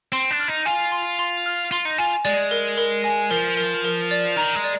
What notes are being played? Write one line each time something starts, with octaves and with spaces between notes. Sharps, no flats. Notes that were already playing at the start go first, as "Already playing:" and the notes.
C4 C6
D4
F6
D#4
F4 G#5
C6
C6
F6
F4 C6
D#4
F4 G#5
G#3 D5
A#4
A#4
G#5
F3 A#4
A#4
A#4
D5
D#3 A#5
G#3
D5